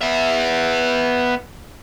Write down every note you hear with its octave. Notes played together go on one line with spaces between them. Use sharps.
B3 E5